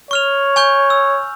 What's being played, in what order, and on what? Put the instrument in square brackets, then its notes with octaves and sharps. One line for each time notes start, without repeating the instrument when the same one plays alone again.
[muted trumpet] C#5 [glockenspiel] C#6 F6 F7
[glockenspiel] G#5 C#6 G6
E6